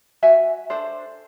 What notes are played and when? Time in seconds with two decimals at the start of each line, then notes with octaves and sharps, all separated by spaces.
0.22 F#4 E5 G#5
0.70 D4 A4 C5